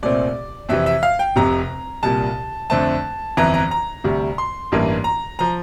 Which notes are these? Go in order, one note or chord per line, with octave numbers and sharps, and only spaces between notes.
C2 A#2 A3 C4 D5
F2 C3 E3 E5
E5
F5
G5
F1 F2 C3 A#5
C2 A#2 G3 A5
F2 D3 A3 C4 A5
G1 F2 E3 A#5
A#5
A#5
D2 C3 G3
C6
A1 G2 E3 A#3
A#5
F3 A#5